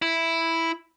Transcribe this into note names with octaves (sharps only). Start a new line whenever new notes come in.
E4